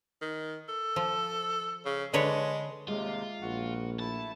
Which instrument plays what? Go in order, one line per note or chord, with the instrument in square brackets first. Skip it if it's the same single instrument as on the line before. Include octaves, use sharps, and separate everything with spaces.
[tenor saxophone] D#3
A4
[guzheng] F3
[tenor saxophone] C#3
[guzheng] D3 B4 C#5 [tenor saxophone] G#3
[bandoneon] D#2 C3 [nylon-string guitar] G#3 [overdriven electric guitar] F4
[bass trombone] A#1 [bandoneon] F#4 F#5
[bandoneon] A3 E4 [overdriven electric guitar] A5